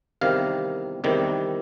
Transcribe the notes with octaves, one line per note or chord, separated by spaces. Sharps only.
E2 C3 D#3 G3 F5
E2 C3 D#3 G3